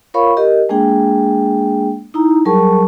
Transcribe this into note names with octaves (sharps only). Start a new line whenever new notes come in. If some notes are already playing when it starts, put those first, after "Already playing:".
F4 A#4 C#5 F5 B5 C#6
G4 A#4 D#5
G#3 A#3 D4 G#4 G5
D#4 E4 A#5
F#3 G3 G#4 A#4 A5 C#6